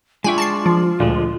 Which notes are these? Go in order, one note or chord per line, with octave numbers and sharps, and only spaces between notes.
G#3 D4 F4 E5 G5 G#5 C#6
A5 A6 C7
F3
D2 A#2 D3 F3 G#3